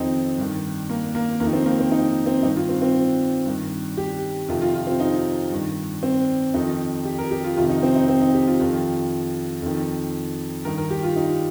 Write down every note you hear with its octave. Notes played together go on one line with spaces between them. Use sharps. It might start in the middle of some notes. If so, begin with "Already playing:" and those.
Already playing: F2 D#3 C4 D#4
G2 D#3
A#3
A#3
F2 D#3 A#3
D#4
C4
A#3
C4
D#4
C4
G2 D#3 D#4
F4
C4
C4
G2 D#3
G4
F2 C3 D#3 F4
F4
F4
C4
D#4
G2 D#3
C4
F2 D#3 D#4
G4
A#4
G4
F4
F2 C3 D#3 F4
D#4
C4
D#4
C4
D#4
G4
F4
F2 D#3
F2 D#3
G2 D#3 A#4
A#4
G4
F4
D#4